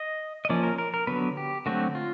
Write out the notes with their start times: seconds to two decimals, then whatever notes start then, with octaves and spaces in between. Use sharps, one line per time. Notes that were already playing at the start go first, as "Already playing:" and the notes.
Already playing: D#5
0.45 D#5
0.49 F3 A#3 C#4 D5
0.63 A#4
0.78 A#4
0.94 A#4
1.07 D3 F#3 B3 B4
1.37 G4
1.66 D3 F#3 A3 C4 F#4
1.95 F4